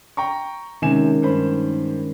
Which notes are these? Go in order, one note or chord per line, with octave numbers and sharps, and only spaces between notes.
G5 A#5 C#6
C3 D#3 G#3 C#4 G#5 E7
G2 C5 B5